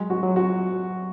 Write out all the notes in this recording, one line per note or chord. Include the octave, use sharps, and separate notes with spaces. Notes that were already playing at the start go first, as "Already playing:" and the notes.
Already playing: F#3 G#3
F#4
F#3
F#4